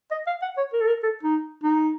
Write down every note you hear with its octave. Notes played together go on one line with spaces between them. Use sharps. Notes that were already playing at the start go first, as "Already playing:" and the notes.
D#5
F5
F#5
C#5
A#4
A4
A#4
A4
D#4
D#4